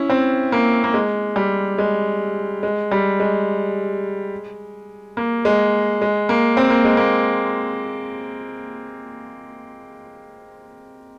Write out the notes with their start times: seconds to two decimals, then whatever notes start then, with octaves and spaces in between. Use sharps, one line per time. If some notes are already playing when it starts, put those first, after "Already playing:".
Already playing: C#4 E4
0.10 C4
0.52 A#3
0.84 A#3
0.94 G#3
1.36 G3
1.78 G#3
2.63 G#3
2.91 G3
3.20 G#3
5.17 A#3
5.45 G#3
6.02 G#3
6.29 A#3
6.57 C4
6.70 A#3
6.85 G#3
6.97 A#3